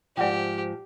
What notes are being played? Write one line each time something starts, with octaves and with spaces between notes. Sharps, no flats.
G#2 F3 G4 D5 F#5 G5